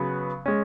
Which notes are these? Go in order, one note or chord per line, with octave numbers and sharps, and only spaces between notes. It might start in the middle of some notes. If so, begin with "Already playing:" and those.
Already playing: C#3 F#3 B3
G#3 C#4